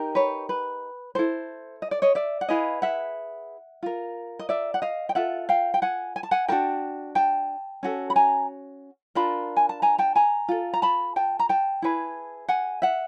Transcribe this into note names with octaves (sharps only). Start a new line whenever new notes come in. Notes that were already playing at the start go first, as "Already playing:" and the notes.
Already playing: D#4 G4 A#4
B4 C#5
B4
E4 A4 C5
D#5
D5
C#5 D#5
D5 E5
F#5
E4 G#4 B4 D#5 F5
E5 F#5
F4 A#4
D#5
D5 E5
F#5
D#5 F5
G5
F4 A4 E5 F#5
F5 G5
G5
F#5 G#5
G#5
A5
F#5 G#5
D4 F#4 A#4 G5 A5
G5 A5
C#4 F#4 A4
B5
G#5 A#5
D4 F4 A#4 A5 B5
G#5
A5
G#5 A#5
G5 A5
G#5 A#5
F4 A4
A#5
A5 B5
G5 A5
A#5
G5 A5
E4 G#4 B4
F#5 G#5
E5 F#5